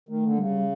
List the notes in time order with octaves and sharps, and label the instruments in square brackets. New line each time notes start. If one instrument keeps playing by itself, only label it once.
[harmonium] D#3 [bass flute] A3
[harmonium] D3
[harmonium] C#3 [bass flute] G3